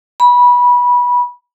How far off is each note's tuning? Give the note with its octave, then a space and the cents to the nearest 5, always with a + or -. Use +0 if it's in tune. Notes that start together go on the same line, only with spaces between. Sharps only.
B5 -20